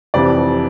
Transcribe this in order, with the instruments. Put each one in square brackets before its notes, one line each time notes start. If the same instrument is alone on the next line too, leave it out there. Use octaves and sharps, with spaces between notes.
[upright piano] F1 F2 C3 E3 D5